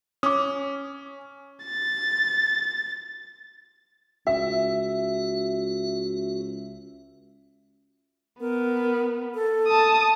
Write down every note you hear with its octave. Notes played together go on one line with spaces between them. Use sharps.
C#4 D6 D#6
A6
C#2 F#4 E5
B3 A#4
A4
A5 D#6